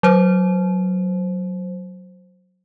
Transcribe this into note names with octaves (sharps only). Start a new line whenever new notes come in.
F#3 C5